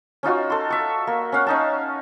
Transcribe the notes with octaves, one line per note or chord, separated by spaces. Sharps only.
C#4 D#4 F4 F#4
A4 C6
E5 C#6
A#3
C#4 F5 F#5
C#4 D#4 A5